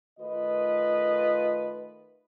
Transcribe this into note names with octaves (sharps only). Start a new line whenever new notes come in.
D#3 A3 F4 B4 D#5